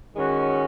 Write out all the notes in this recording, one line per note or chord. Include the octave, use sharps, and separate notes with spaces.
D#3 G#3 C#4 F#4